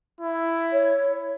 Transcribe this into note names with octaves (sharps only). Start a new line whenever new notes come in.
E4
C#5